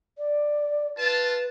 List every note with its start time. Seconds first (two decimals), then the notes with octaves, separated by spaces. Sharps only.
0.18 D5
0.98 F4 B4 A5